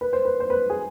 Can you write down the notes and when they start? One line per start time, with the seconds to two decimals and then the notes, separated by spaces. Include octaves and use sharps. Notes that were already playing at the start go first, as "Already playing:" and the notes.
0.01 B4
0.13 C5
0.25 B4
0.40 C5
0.50 B4
0.70 G#4